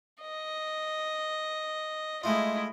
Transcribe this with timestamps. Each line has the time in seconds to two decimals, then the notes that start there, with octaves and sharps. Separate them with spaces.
0.21 D#5
2.23 G#3 A3 E4 F4 D#5